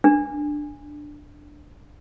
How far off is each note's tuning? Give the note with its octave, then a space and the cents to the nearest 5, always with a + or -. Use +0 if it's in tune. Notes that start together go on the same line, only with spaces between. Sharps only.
D4 +5